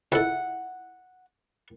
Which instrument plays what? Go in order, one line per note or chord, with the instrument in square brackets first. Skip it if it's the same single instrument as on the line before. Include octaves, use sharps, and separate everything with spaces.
[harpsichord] C#2 A4 [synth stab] E4 [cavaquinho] F#5